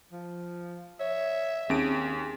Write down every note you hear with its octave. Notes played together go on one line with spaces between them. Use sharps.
F3
C#5 E5
D#2 C4 C#4 G#4 D7